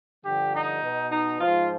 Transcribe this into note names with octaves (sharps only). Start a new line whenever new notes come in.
G2 D3 F3 G4
D#4
B2
D#4
G#2 F3 F4